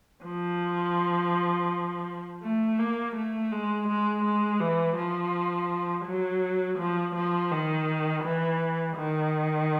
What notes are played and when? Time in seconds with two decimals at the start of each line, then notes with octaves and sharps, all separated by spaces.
0.24 F3
2.43 A3
2.79 A#3
3.16 A3
3.52 G#3
3.88 G#3
4.24 G#3
4.60 E3
4.96 F3
6.05 F#3
6.78 F3
7.15 F3
7.51 D#3
8.24 E3
8.97 D#3